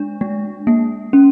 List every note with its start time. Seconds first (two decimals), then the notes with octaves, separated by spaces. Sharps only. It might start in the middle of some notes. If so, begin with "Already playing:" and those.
Already playing: G#3 D4
0.21 G#3
0.67 A#3
1.13 C#4